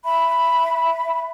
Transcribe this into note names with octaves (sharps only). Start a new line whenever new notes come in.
E5 B5